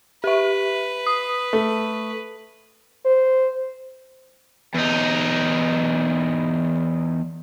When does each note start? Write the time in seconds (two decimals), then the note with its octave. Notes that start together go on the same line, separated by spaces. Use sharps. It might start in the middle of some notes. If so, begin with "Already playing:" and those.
0.24 G4 B4 E5
1.07 D#6
1.53 A3
3.06 C5
4.75 E2 D#4